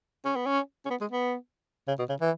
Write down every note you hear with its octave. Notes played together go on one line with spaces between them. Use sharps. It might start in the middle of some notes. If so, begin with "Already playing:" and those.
C#4
B3
C#4
C#4
B3
G#3
B3
C#3
B2
C#3
E3